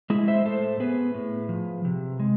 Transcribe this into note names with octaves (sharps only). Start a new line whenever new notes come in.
G#3 E4 G#4
C5 E5
A2 A4 C5
B3 G#4 B4
A2
F3
C3
G#3